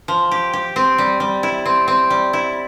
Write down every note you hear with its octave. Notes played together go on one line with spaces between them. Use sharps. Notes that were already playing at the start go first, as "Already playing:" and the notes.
F3
G4
G4
C4
G3
G3
E4
C4
C4
G3
E4